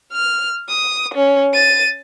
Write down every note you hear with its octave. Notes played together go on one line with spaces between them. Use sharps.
F6
D#6
C#4
A6 D#7